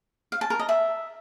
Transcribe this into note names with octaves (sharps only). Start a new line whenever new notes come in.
F5
A5
A#4
D#5
E5